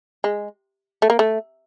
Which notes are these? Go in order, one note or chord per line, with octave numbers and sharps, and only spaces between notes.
G#3
A3
A#3
A3